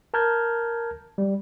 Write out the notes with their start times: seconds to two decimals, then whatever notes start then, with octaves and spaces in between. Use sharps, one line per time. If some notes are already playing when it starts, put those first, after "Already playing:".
0.14 A#4 A5 A#5 F6 G6 G#6
1.18 G3